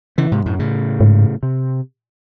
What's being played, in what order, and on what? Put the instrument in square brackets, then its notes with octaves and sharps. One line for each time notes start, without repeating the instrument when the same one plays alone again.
[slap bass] C#3 E3
G#2 C3
F#2 A2
A2 C#3
[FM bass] G#2
[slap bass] C3